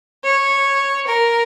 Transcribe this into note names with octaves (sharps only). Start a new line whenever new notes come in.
C#5
A#4